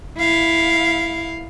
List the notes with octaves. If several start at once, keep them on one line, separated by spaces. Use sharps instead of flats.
E4 F5